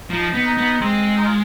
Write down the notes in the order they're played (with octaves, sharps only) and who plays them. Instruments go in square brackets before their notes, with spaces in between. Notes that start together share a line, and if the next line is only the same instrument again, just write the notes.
[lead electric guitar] F3 [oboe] D#4
[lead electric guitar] B3
[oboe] D#4
[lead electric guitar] B3
[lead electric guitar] G#3 [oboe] C4
[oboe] D#4
F4